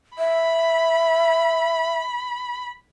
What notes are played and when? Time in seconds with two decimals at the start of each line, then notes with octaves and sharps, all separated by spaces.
0.18 E5 B5